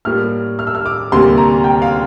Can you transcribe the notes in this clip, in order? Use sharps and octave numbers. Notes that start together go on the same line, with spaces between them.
A2 G3 A#3 F6
F6
E6
F6
D6
D2 C3 G3 A#3 C6
A#5
G5
F5